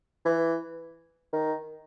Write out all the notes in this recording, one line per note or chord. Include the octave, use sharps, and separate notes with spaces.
E3
D#3